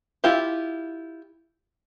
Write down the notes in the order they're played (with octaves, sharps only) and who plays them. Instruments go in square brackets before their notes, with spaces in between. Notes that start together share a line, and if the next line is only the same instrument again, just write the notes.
[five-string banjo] E4 F4 G4